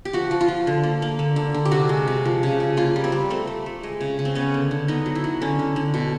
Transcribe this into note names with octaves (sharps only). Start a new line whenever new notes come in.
G4
F3 F#4
F3
F4
F3
D3
A#3
A#3
D3
D3
D3
G4
C3 F#4
G#3
C3
F3
C#3
C#3
A#3 F4
G3
C4
G3
A3 C4
A3
A3
G#3
C#3
C#3
C4
B3 C#4
D3
D3
B3 D#4
F#3
E4
F#3
D3 C#4
D3
D3
B2